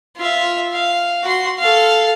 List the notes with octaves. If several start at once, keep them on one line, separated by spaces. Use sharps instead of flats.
F4 E5
F5
F#4 C6
A4 F5